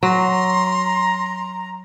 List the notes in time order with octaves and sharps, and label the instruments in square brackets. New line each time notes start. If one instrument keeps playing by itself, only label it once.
[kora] F#3 [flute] A#5 [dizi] C6